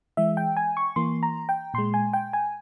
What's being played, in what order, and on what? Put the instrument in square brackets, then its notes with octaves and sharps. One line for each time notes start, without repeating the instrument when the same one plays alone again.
[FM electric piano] E3 G#3 E5
G5
G#5
C#6
E3 A#3 C6
A#5
G5
A#2 G#3 C6
G#5
G5
G#5